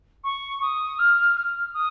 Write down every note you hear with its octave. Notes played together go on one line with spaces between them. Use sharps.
C#6
D#6
F6
F6
D#6